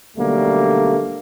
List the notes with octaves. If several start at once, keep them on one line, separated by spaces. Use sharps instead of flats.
B1 D3 G3 A3 A#3